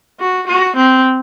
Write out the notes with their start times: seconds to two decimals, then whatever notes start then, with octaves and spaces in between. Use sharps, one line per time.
0.20 F#4
0.47 F#4
0.76 C4